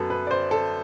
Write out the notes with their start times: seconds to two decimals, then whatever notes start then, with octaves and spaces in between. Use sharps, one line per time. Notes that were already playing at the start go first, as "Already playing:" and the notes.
Already playing: F#2 F#3 B3 A4 B4
0.10 B4
0.27 D5
0.31 C5
0.51 A4